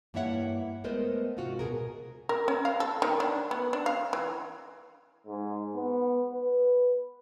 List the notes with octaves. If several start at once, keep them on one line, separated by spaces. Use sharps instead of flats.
G2 A#3 E4 C#5 E5 F#5
G#3 A3 B3 A#4 C5 D#5
G#2 C3 F4 F#4
B2 G#4 A#4
A#4
C#4
F5
A4
D#3
D4
B3
D4
F5
E3
G#2
B3
B4